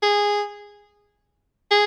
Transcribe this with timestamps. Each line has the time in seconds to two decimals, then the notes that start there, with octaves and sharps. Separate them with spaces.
0.02 G#4
1.71 G#4